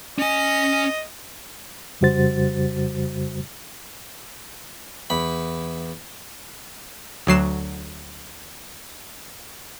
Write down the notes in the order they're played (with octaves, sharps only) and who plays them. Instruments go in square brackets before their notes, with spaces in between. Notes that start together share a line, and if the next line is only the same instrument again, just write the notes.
[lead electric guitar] C#4 G#5 [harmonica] D#5
[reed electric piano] F2 C#3 G3 F#4 C5 A6
[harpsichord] E2 B5
[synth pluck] D2 F#3 C7 E7